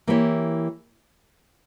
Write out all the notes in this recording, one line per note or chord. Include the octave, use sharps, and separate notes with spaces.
E3 A#3 E4 G4 C#5